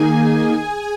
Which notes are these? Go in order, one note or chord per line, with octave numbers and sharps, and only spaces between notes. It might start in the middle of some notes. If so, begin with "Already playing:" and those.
Already playing: D#3 A#3 D#4 G#4 G#5